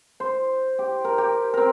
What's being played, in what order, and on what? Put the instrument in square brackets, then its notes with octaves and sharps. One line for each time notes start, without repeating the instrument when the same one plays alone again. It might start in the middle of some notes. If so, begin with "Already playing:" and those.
[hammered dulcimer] C5
G4
A#4
G4
C4 A#4